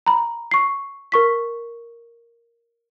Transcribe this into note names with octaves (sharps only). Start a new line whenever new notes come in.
A#5 B5
C#6 C7
A#4 C#6 B6